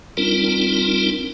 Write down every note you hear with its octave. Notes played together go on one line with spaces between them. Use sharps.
G3 C4 D4 D#4 F4 A#4